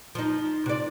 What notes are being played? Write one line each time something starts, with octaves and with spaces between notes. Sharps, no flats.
F3 D#4
C3 D5